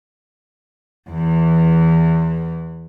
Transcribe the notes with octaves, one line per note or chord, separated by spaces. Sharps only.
E2 E3